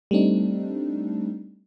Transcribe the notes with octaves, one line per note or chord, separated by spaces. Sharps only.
G3 A3 C4 D4 D#4